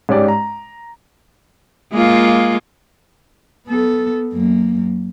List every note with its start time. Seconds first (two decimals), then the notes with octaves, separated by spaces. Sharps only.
0.09 G#2 C#4 G4 D5
0.28 A#5
1.93 G#3 A#3 F4
3.67 B3 A4
4.33 F#2 A#3